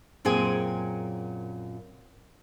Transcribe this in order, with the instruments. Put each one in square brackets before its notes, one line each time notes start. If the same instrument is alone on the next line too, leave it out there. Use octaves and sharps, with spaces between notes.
[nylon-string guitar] F#2 A#2 C4 G#4 G#5